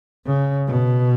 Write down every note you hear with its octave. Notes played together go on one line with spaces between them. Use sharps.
C#3
B2